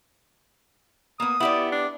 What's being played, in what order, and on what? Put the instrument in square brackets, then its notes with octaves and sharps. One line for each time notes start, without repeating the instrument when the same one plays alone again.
[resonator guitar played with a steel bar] A#3 B3 [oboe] D#6
[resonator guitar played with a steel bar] B3 G4 D5 [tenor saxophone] E4
[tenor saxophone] D4